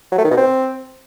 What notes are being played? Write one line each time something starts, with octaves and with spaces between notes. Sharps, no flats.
F#3
A3
D#3
B2
C4